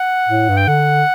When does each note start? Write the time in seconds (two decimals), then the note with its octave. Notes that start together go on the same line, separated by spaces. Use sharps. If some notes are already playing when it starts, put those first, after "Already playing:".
Already playing: F#5
0.28 A2
0.49 G2
0.57 G5
0.68 D3 F#5